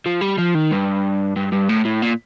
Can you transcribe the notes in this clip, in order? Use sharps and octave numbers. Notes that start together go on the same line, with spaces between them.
F3
G3
F3
D#3
G2
G2
G2
A2
A2
A#2